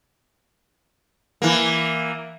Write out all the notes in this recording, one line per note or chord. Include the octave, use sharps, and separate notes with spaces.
E3 A#3